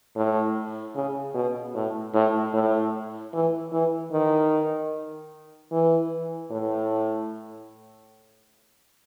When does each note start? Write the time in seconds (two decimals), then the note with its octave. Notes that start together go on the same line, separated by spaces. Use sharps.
0.16 A2
0.96 C#3
1.34 B2
1.75 A2
2.14 A2
2.53 A2
3.33 E3
3.72 E3
4.12 D#3
5.72 E3
6.51 A2